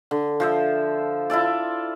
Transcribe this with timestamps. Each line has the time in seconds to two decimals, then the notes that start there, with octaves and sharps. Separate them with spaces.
0.11 D3
0.40 F3 C5 E5
1.30 E4 F4 A4 D5